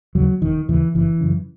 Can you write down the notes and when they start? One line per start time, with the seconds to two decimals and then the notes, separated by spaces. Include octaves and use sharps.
0.15 D#2 C#3 F#3
0.42 E1 D#3
0.68 D#2 C#3 E3
0.95 F#1 E3
1.20 F#2 C#3